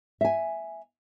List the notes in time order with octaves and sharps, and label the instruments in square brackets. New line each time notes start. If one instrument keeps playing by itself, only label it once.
[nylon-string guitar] E5 G#5